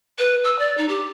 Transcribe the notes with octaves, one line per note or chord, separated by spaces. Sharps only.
B4
E6
D5
D#4
G4